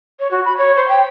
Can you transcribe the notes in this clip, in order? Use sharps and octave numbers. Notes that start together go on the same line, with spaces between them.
C#5
F#4
B5
C#5
C5
G5